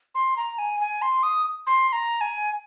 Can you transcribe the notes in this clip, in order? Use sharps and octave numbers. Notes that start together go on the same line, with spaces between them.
C6
A#5
G#5
G#5
C6
D#6
C6
C6
A#5
G#5